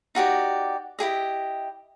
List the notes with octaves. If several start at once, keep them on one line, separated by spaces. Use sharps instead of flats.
D#4 F#4 G4 D5
E4 G4 G#4 D#5